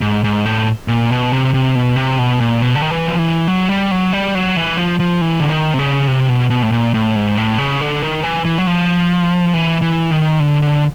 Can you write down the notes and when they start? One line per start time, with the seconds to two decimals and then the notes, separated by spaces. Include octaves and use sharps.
0.01 G#2
0.24 G#2
0.46 A2
0.88 A#2
1.11 B2
1.32 C3
1.54 C3
1.75 B2
1.96 C3
2.19 B2
2.40 A#2
2.62 B2
2.75 D3
2.82 D#3
2.91 E3
3.08 F3
3.19 E3
3.48 F#3
3.69 G3
3.91 F#3
4.13 G3
4.35 F#3
4.56 E3
4.77 F3
5.00 F3
5.21 E3
5.40 D3
5.50 D#3
5.74 C3
5.79 C#3
6.07 C3
6.29 B2
6.50 B2
6.62 A2
6.72 A#2
6.94 A2
7.16 G#2
7.37 A2
7.58 C#3
7.81 D3
8.02 D#3
8.23 E3
8.45 E3
8.58 F#3
8.67 F3
9.54 E3
9.82 E3
10.11 D#3
10.40 D3
10.62 D3